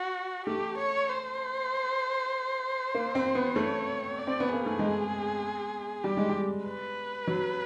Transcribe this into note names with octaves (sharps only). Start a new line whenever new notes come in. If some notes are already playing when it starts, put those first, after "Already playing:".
Already playing: F#4
A3 G4
C#5
C5
A#3
C4
B3
A3 C#5
D5
C4
B3
A#3 G#4
A3
G#3
G3 G4
G#3
G3
B4
F#3